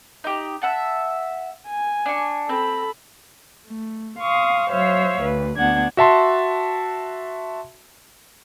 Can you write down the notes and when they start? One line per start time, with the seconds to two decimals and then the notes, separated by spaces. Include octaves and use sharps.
0.24 D#4 G4
0.62 E5 F#5 A5
1.68 G#5
2.06 D4 C#6
2.49 C4 A4 B5
3.66 A3
4.19 F5 C6 C#6 D#6
4.71 F#3 C5 C#5 E5 F5
5.21 D2 B4
5.58 D2 B3 D4 F#5 G#6
5.97 F#4 E5 A5 C6